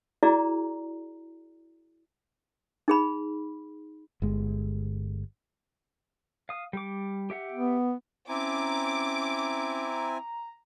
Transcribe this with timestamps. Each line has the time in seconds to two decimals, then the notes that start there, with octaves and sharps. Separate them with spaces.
0.23 E4 F#4 G#4 D5 A#5
2.88 D#4 G#4 B5
4.22 G1 G#3
6.49 F5 D#6
6.73 G3 D6
7.30 G4 E5 F#5
7.53 B3
8.29 C4 C#4 E4 G#5 A#5 D6